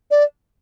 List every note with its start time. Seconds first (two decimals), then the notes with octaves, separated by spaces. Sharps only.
0.11 D5